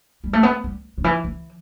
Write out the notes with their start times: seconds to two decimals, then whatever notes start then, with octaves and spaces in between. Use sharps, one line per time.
0.24 G3
0.33 A3
0.43 B3
0.64 G3
0.98 D3
1.04 E3
1.24 E3